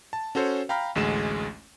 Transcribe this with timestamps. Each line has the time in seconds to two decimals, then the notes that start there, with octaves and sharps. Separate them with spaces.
0.13 A5
0.35 C#4 F#4 A4 C5 C#5
0.69 F5 G5 A#5 B5 F6
0.95 A1 D2 G#3 G#4 E7